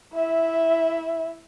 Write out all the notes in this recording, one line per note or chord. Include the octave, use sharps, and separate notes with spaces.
E4 E5